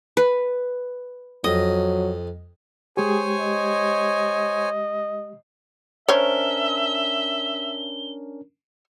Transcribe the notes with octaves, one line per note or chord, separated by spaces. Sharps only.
B4
F2 F#3 D#5 D#6
G#3 G4 G#4 C5 C#5 G#5
D#5
C#4 D4 A#4 C5 C#5 E5 G7